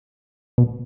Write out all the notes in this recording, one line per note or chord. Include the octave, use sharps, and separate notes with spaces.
B2